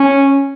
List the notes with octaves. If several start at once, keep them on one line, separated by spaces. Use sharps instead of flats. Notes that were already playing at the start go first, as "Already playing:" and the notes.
Already playing: C#4